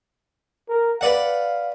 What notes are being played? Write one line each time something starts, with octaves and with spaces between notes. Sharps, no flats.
A#4
B4 D5 F5 F#5